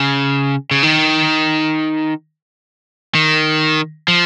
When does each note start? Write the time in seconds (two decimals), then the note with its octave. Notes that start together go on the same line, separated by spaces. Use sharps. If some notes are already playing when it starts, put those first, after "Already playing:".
Already playing: C#3
0.71 C#3
0.83 D#3
3.15 D#3
4.08 F3